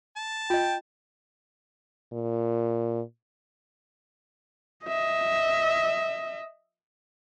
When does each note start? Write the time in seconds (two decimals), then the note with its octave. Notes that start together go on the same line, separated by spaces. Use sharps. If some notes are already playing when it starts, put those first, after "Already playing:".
0.17 A5
0.50 F4 D#5 G5
2.12 A#2
4.85 D#5 E5